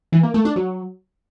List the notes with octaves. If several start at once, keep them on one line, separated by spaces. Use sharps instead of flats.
E3
A#3
A3
D4
F#3